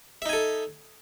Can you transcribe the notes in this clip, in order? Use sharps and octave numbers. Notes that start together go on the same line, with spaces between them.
D#4 A4 E5 G#5